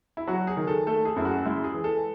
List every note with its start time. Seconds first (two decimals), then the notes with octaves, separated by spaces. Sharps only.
0.17 E4
0.27 F#3 F#4
0.47 G#4
0.57 D#3
0.67 A4
0.87 A3 A4
1.05 G#4
1.16 F#2 E4
1.25 F#4
1.45 G#3 E4
1.64 G#4
1.74 E3
1.84 A4